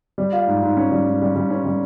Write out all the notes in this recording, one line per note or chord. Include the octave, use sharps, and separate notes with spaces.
G3
F4
G#2
G#2
C#4
G3
G#2
G3
G3
C#4
G3